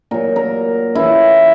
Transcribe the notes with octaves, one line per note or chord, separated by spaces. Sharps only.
A#2 F#3 A#4
A#4
C#3 E3 E4